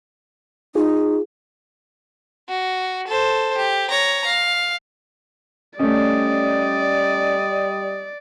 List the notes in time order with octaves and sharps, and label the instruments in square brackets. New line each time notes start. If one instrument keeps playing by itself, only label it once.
[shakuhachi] D#4 [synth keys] F4 G#4
[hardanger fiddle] F#4
A4 C5
G4
C#5 A#5
F5
[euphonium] G3 [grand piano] A3 C#4 [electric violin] D5 [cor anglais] D#5